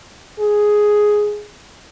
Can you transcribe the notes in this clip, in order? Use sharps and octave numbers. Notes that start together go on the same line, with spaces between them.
G#4